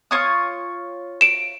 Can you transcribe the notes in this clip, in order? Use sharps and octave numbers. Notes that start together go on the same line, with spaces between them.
F4 C#5 D#6
D7 E7